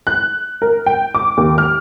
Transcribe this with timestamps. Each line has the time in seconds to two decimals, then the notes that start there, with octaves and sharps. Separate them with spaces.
0.07 F#6
0.62 A#4
0.86 G5
1.15 D6
1.37 D#2
1.58 F6